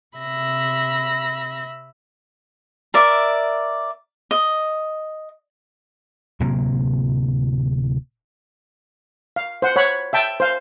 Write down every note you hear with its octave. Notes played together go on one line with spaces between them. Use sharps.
C3 E5 B5 A#6
A#4 D5 E5
D#5
D1 C3 F#3 A#3
F5
C5 F#5
C#5 F#5 B5
E5 G5 A5
C5 F5